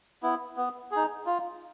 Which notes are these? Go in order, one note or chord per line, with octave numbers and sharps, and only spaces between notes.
B3 E4
B3
D#4 G#4
F4